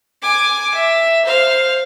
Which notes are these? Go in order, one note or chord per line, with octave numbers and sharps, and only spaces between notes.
G#5 D6
E5
C5 F5